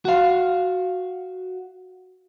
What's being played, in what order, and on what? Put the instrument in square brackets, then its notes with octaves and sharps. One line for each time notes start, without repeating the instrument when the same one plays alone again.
[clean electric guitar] F#4 F5